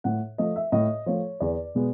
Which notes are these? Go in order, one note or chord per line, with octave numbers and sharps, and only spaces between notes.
A2 F#5
F3 A3 D#5
E5
A2 D#5
F3 A3 C#5
E2 D5
B2 G#3 B3